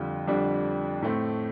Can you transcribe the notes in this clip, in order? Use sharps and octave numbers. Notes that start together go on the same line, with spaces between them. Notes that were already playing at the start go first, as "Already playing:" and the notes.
Already playing: F2 D3 G3 F4
F2 D3 G3 D4
A2 A3 C4